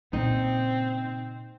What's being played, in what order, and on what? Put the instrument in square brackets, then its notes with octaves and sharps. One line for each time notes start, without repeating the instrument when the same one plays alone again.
[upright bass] A#2 C#3 [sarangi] C4 [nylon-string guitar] D#4